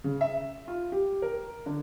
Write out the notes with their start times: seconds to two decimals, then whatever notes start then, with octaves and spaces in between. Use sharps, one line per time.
0.04 C#3
0.21 E5
0.68 F4
0.92 G4
1.22 A#4
1.66 D3